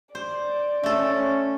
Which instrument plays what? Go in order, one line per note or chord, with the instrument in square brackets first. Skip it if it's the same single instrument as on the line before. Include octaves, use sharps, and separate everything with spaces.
[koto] C5 [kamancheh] D5
[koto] A3 A4 [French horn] C#4